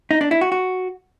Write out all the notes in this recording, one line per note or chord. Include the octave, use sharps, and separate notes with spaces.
D#4
D4
E4
F#4
F#4